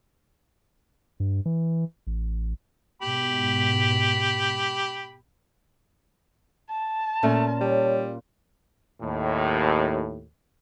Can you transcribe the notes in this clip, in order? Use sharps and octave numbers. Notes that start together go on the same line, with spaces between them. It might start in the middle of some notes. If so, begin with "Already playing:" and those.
G2
E3
A1
G#2 B2 G4 B5
A5
A#2 A3 C#4
G3 C#5
D#2 A2